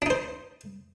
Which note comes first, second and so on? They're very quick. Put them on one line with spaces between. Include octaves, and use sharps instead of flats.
D4 D#4 C5